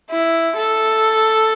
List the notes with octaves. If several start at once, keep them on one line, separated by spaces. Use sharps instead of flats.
E4
A4